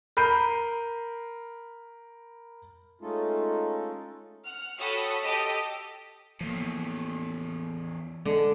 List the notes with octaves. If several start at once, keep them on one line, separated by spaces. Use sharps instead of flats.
A#4 B5 G6 C7 D#7
G#3 A3 C#4 D#4 F4 A4
F#5 F6
F#4 A4 C#5 G5 B5 D#6
G4 A4 D#5
E2 A2 F3 A#3
D3 G#3